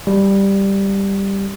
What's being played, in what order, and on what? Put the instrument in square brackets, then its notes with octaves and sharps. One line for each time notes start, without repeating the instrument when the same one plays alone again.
[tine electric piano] G3